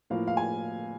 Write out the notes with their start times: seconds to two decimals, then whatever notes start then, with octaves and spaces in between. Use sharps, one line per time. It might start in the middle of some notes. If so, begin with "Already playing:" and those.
0.10 A2 F3 A#3 F5
0.27 F5
0.37 G#5